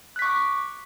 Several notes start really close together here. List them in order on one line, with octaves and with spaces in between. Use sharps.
F#6 B6 C#6 D6